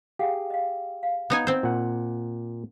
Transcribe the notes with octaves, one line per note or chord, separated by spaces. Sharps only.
G4 G#4 F5 F#5
D#5 F5
F5
B3 D#4 G#5
C4 C5
A#2 F#5